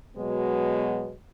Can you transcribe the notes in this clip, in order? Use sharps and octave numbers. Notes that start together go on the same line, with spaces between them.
B2 F#3 G#3 B3